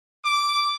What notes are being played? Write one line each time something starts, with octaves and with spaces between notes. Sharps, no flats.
D6